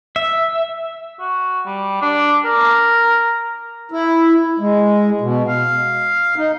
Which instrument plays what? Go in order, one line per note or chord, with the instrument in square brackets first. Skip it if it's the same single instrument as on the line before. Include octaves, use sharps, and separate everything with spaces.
[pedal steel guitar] E5
[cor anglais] F#4
G3
D4
A#4
[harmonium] E4
G#3
B2
F5
D#4